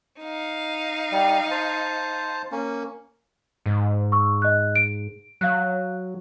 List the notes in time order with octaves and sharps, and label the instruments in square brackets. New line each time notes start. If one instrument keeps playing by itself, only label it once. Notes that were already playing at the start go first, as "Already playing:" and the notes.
[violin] D#4 F5
[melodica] G3
C5 A5
A#3 C#4
[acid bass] G#2
[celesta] C#6 E6
D#5 F#6
D7
[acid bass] F#3 [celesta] F5 F#6